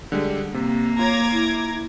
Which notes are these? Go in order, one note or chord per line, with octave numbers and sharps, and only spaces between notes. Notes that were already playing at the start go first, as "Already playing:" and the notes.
D3 G3 G#3
C3 A#3
F4 C#5 A#5 D6 G#6
E4